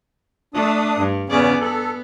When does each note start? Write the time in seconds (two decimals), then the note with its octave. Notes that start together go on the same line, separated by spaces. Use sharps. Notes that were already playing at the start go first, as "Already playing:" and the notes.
0.54 A3 D4 D#6
0.99 G2
1.30 E2 C#3 B3 C#4 G#4 D5
1.61 B3 A4